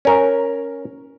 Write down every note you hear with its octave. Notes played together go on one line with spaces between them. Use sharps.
C#4 A#4